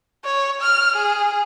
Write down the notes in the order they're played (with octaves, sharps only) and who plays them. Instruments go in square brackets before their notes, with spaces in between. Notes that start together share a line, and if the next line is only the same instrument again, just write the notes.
[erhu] C#5
F6
G#4